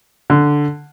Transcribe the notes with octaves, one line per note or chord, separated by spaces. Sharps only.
D3